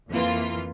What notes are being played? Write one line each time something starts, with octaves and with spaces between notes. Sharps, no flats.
F2 E3 A#3 F4